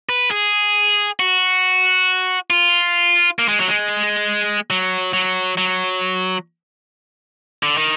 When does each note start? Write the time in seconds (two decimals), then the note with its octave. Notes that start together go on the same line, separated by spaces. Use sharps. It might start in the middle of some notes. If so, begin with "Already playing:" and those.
0.09 B4
0.31 G#4
1.20 F#4
2.50 F4
3.39 A#3
3.48 G#3
3.59 F#3
3.68 G#3
4.70 F#3
5.13 F#3
5.57 F#3
7.63 D3
7.77 D#3